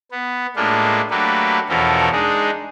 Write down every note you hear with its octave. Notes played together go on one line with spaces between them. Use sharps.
B3
A2 G#3 A#3 D4 F4
F#3 A3 A#3 D4 G4 B4
E2 B2 F3 C#4 A4 A#4
G#3 D4 D#4 G#4